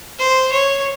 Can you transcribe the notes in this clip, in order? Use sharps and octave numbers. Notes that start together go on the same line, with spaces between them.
C5
C#5